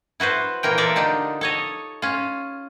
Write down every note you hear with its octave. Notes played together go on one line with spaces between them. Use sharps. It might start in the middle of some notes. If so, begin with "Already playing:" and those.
E4 F#4 B4 C5
A#2 E3 A#4 G5
F4 A4 A#4 D5 E5
D3 D4 D#4 G4
A4 C#5 D#5
C#4 F4